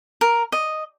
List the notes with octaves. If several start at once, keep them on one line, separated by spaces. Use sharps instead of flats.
A#4
D#5